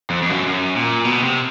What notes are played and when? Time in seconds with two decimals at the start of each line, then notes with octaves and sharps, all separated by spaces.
0.10 F2
0.22 F2
0.29 F#2
0.47 F#2
0.76 A#2
1.05 B2
1.23 C3